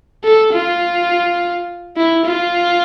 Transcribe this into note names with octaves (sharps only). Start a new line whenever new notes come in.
A4
F4
E4
F4